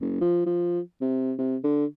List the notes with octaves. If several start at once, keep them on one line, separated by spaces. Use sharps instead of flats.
F#1
F3
F3
C3
C3
D3